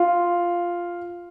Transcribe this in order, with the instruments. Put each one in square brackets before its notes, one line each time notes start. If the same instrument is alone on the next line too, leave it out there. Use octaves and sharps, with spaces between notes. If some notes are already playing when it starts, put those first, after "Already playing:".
Already playing: [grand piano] F4